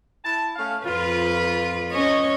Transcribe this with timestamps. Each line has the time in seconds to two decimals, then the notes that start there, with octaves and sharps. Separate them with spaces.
0.23 E4 A5
0.56 A3 C#4 F5
0.86 F2 F4 B4
1.91 C#4 C#5 D#5